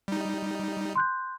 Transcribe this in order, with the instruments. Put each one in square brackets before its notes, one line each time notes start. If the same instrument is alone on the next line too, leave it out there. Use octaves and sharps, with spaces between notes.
[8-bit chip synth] G3 D#4
[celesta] C6 F#6 G6